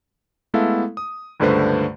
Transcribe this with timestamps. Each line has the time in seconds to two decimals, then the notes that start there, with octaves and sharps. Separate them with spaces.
0.54 G#3 A3 B3 E4 A4 F5
0.97 D#6
1.40 C#2 G2 D3 A3 B4 C5